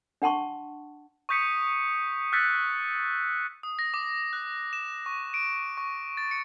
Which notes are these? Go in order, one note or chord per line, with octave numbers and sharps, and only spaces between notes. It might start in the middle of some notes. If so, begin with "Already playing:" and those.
D4 F#5 A5 C6 C#6
C#6 D#6 G6 B6 C#7 D#7
E6 F#6 G6 A6 B6 C#7
D#6
A#6
D6
F#6
E7
C#6
D7
C#6
A6
C#7